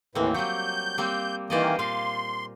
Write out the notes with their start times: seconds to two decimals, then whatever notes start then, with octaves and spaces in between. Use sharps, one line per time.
0.15 D#2 A2 E3 A#3 C4
0.34 F#3 G3 G6
0.98 G3 A#3 C4
1.50 D#3 E3 A#3 C5 D5 D#5
1.79 A#2 F5 C6